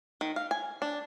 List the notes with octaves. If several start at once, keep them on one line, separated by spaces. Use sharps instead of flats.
D#3
F5
G#5
D4